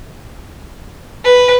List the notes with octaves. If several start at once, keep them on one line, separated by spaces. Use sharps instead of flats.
B4